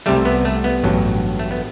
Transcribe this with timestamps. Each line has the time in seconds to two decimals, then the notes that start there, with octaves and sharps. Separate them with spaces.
0.06 C2 C3 G3 A3
0.25 B3
0.45 A3
0.64 B3
0.84 A1 G2 F#3
1.39 A3
1.51 B3